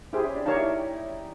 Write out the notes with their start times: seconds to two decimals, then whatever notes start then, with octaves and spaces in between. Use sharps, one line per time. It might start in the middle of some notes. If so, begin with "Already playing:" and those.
0.13 E4 G4 G#4 C5
0.24 C#4
0.35 D4
0.46 D#4 G4 A#4 C#5 F5 A5
0.57 E4